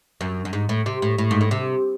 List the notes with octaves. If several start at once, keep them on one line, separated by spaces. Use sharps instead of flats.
F#2
F#2
G#2
A2
C3
A2
A2
G#2
A2
C3